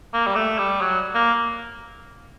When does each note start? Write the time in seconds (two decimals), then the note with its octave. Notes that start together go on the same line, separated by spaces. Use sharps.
0.14 A#3
0.27 G3
0.36 A3
0.58 G3
0.81 F#3
1.15 A#3